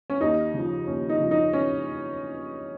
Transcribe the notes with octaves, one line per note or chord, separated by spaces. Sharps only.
C#4
D#2 D#4
C#3 F3
D#2 C#4
D#4
C#3 F3
D#4
C#4